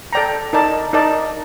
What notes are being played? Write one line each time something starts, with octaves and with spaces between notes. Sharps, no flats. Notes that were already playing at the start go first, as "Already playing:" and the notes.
A4 D5 G5 A#5
D#4 A#4 D5 A5
D#4 A#4 D5 A5